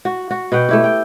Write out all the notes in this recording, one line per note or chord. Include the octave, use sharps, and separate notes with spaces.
F#4
F#4
B2 B4 F#5 G5
A3 E4 G4
G5